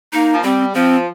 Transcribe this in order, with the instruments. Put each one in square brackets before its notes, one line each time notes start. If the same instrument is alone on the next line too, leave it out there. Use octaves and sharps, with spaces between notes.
[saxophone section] A#3 [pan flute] D#4
[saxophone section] F3
[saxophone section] G3 [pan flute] C4
[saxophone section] F3 [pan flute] C4